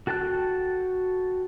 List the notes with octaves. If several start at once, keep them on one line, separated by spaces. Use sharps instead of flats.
F#4 A4 G5 A5 F#6